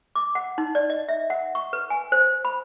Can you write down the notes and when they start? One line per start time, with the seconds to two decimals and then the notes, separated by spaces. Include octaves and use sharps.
0.16 D6
0.35 F#5
0.58 D#4
0.75 D5
0.90 D#5
1.09 E5
1.30 F#5
1.55 C#6
1.73 B4
1.90 G#5
2.12 C5
2.45 B5